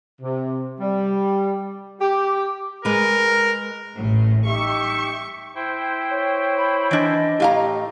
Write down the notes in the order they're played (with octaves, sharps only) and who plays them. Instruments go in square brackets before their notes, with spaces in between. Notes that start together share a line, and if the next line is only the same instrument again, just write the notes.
[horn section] C3
G3
G4
[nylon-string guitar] G#3 B4 [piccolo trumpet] A#4
[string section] A1 A2
[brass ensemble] D#4 G4 E5 [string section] C#6
[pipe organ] E4 C5 G5
[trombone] C#5
[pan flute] B5
[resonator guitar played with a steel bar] E3 D4 [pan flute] D#5
[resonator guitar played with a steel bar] A2 F5 A#5 [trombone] G4